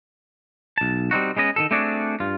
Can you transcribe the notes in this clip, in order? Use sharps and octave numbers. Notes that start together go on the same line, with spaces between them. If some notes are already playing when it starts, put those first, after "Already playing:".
B1 A5
G3 C4 D#4 F#4
G#3 B3 C#4 D#5
D#3 F#3 A4
A3 C4 D4 F#4 G#4 D5
G2 F4